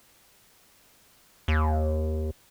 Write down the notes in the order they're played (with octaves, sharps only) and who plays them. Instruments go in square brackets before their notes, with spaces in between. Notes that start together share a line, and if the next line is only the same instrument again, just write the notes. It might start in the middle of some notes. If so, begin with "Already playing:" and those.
[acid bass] D#2